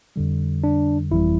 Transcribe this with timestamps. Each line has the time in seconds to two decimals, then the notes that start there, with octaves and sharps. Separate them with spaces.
0.16 F2 D3 G3
0.64 D4
1.11 G1 F2 E3 G3 E4